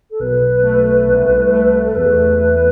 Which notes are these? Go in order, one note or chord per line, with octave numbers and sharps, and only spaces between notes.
A4
B1 B4
A3
C2
A3
A4
E2 B4
A3